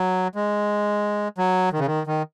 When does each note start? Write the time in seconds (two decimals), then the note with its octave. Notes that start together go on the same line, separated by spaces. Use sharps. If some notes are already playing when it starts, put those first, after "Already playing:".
Already playing: F#3
0.35 G#3
1.38 F#3
1.73 D#3
1.79 C#3
1.86 D#3
2.07 D#3